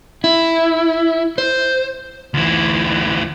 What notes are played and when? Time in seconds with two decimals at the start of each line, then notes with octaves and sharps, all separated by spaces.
0.24 E4
1.38 C5
2.34 D2 E3